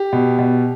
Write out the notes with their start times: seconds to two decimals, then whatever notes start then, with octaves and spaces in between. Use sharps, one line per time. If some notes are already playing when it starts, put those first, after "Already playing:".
Already playing: G4
0.13 B2
0.38 B2